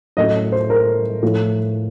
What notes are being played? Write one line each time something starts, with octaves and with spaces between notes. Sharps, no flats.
A2 F#3 A3 C#4 D#5
C5
A#4
A2 F3 A3